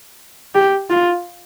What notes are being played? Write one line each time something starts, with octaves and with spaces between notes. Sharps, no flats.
G4
F4